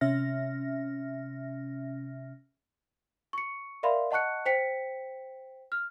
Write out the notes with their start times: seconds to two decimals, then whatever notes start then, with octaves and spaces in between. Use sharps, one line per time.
0.01 C3 C#4 E5 F6 A#6
3.33 C#6 C#7
3.83 A#4 D5 E5 F5 B5 C6
4.11 D#5 F#5 A5 C#6 F#6 C#7
4.46 C5 G5 B6 C#7
5.72 F6